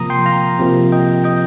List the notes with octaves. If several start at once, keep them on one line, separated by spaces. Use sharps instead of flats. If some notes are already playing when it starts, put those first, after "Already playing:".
Already playing: C3 F3 A#3 A#5 D#6
G5 C6
F5 A#5
C3 F3 A#3
D#5 G5
D#5 G5